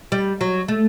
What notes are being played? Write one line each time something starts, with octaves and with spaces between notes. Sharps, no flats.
G3
F#3
A3